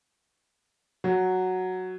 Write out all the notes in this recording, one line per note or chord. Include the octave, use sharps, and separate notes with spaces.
F#3